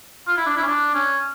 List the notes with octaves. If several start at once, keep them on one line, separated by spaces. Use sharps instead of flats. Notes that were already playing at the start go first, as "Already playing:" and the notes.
F4
E4
D4
E4
C#4
D4
C#4